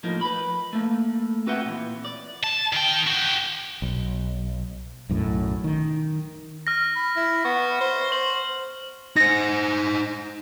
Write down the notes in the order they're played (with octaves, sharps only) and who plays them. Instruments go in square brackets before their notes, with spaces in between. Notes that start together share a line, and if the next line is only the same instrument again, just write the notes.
[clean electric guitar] A2 F3 A#3 D#4
B4 B5
A3 A#3
C4 F#4 B4 E5 F#5 G5
A#2 E3
D5
[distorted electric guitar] A5
D#3 G5
F#4 G5
[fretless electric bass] B1
B1 F#2 A2
D#3
[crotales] F6 A#6
[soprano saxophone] B5
E4
[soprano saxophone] B3 [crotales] C#6
[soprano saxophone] C5
[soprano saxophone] C5 [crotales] F#7
[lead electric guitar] D#4 C5 [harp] A#6 C#7